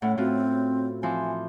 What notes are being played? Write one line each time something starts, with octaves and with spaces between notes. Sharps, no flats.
A2 C#4 F#5
A2 C4 F4 F#4
E3 F3 C4 G#5